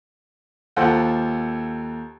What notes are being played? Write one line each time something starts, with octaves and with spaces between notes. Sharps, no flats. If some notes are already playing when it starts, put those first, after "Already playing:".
D#2 F4 A4 C5 F#5